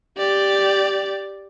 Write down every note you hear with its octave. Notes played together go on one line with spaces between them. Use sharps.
G4 D5